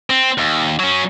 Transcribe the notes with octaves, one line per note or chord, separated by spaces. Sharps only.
C4
D#2
F#3 C#4